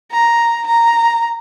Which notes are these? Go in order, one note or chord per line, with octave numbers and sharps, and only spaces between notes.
A#5
A#5